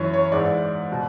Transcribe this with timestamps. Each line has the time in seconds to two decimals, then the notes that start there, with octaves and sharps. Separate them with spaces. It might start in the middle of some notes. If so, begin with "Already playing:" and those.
Already playing: F#2 E3 C#5
0.13 C#5
0.32 G#2 E3 D5
0.92 B2